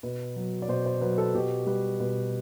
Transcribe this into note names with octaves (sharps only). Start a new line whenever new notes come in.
B2 B4
F#3
D5
B2 C5
C5
F#3 B4
A4
B2 G4
G3 B4
B2 B4